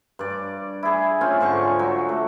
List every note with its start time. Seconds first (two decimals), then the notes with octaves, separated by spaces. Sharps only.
0.19 G2 D5
0.83 E4 G#4
1.21 C4 C#4 F4
1.40 G#2 D3 C#6
1.79 F#3
2.09 A3